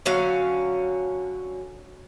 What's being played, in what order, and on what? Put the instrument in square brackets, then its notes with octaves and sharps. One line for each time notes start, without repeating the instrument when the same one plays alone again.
[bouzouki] D3 F#3 C#4 F5